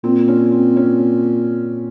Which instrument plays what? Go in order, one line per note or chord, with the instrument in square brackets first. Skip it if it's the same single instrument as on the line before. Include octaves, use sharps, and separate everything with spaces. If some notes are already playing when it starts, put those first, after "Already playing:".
[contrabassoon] A#2 [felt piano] C4
[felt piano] C#4
C4
C#4